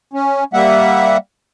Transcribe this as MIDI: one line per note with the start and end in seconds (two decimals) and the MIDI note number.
0.14 0.44 61
0.54 1.17 55
0.54 1.17 58
0.54 1.17 76
0.54 1.17 78